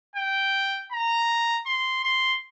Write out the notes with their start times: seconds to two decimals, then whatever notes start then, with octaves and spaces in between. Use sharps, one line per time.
0.16 G5
0.92 A#5
1.66 C6
2.04 C6